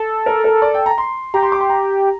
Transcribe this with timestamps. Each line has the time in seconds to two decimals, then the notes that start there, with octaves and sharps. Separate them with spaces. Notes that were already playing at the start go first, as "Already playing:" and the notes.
Already playing: A4
0.26 A#4
0.44 A#4
0.62 D5
0.74 G5
0.86 A#5
0.98 C6
1.34 G4 A#5
1.43 C6
1.52 D6
1.60 C6
1.70 A#5